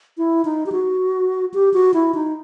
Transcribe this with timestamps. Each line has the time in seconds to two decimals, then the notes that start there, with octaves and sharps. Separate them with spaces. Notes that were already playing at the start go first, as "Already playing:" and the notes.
0.18 E4
0.45 D#4
0.66 G4
0.72 F#4
1.54 G4
1.74 F#4
1.94 E4
2.15 D#4